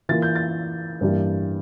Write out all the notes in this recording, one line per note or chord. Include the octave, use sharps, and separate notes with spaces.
E3 A#3 F4 A6
G6
A6
G2 E3 G3 A#3